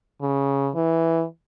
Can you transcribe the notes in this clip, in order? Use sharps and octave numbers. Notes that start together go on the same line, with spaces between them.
C#3
E3